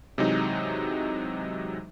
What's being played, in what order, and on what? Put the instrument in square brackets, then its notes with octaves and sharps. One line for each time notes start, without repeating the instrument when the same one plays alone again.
[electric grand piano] C3 E3 F#3 G#3 D#4